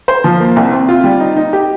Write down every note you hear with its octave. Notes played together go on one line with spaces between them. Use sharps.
C5
F3
A#3
C2
C4
F4
G3
D#4
D#4
G4